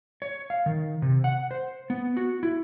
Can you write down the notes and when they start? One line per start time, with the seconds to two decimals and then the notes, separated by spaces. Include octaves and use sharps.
0.22 C#5
0.50 F5
0.66 D#3
1.02 C3
1.24 F#5
1.51 C5
1.90 B3
2.17 F#4
2.43 E4